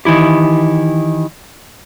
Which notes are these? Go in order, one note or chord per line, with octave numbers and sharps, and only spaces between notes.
D#3 E3 E4 G4